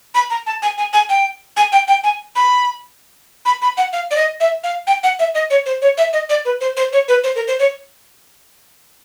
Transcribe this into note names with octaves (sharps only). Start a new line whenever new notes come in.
B5
A#5
A5
G#5
G#5
G#5
G5
G#5
G5
G5
G#5
B5
B5
B5
F#5
F5
D5
D#5
E5
F5
G5
F#5
E5
D#5
C#5
C5
C#5
E5
D#5
D5
B4
C5
C5
C#5
B4
C5
A#4
C5
C#5